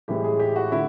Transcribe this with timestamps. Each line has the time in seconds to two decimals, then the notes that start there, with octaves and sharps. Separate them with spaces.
0.08 A2 E3 G#3 G4
0.24 G#4
0.39 G4
0.56 F#4
0.72 D3 E4